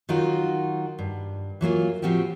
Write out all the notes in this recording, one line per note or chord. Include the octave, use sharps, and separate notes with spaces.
D#3 F#3 D#4 F4 F#4 A#4
G2
E3 F#3 A#3 F4
A2 F3 C4 F#4 G4